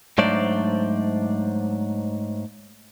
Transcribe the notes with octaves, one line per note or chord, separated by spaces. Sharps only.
G#2 F#3 A3 D4 C5 D5